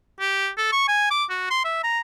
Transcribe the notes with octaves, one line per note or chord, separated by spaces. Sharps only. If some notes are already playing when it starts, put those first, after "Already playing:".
G4
A4
C#6
G#5
D6
F#4
C6
E5
A#5